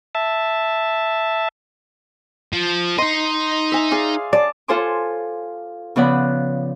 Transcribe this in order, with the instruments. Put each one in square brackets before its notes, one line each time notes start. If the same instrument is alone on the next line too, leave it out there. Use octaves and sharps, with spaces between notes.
[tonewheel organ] E5 A5
[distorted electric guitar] F3
[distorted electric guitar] D#4 D#5 [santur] C6
[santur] E5 G#5
G#4 D5 F5
[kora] D5 [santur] A5
[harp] F4 A4 C5 G#5 C6 D6
C#3 F3 B3 D5 F#5 B5